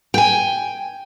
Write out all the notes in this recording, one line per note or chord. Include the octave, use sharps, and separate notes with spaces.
G5 G#5